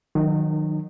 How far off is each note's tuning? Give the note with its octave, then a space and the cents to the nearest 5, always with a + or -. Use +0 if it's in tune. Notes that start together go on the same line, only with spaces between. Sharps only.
D#3 -5 F#3 -30 D#4 -35